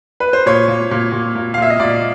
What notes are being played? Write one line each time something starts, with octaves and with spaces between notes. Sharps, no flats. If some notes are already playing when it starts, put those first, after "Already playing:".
B4
C5
A#2 C#5
A#2
A#2
A#2
A#2
F5
A#2 E5
D#5
A#2 D5